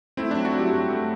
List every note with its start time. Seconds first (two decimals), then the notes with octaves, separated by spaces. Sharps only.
0.17 A3 C4 E4
0.31 F#3 D4
0.45 D4 F#4
0.54 F#3
0.59 E4 G4
0.72 G2
0.90 A3